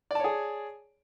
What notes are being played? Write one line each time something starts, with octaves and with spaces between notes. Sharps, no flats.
G#4 C#5 D5 A5